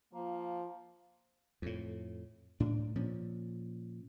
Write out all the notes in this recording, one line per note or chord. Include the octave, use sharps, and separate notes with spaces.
F3 A#3
F2 A2
A2 D4
A#2 F3 C#4